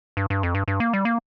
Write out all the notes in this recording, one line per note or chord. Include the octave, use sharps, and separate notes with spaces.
G2
G2
F2
G2
G2
A#3
G3
A#3